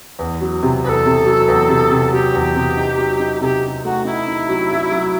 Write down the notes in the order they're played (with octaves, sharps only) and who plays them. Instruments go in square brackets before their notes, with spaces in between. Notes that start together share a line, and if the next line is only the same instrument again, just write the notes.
[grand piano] E2
F#3
C3
[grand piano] E2 [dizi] A4 B4
[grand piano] C3
F#3
E2
C3
C3
[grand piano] F#3 [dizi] G4
[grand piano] E2
C3
D#4
F#3
D#4
[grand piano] C3 [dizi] G4 A4
[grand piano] D#4
[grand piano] A3 [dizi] F#4
[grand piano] D#4 [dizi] E4
[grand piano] D#4
F#3
F#3
F#3